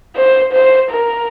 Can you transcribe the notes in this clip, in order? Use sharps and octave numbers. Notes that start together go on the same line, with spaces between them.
C5
C5
A#4